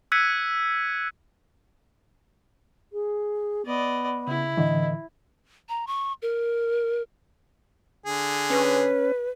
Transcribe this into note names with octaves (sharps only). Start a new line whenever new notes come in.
E6 F#6 G#6 B6 C#7 D#7
G#4
B3 D5 D#5
C#3 E4
A2 D3 E3 D#5
A#5
C#6
A#4
D3 G#4
C#4 B4